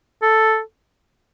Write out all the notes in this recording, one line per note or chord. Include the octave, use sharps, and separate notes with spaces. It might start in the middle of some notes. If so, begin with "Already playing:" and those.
A4